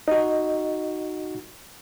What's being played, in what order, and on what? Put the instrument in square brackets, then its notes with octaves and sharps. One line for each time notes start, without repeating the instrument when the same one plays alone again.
[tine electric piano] D#4 F#4 [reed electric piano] D#5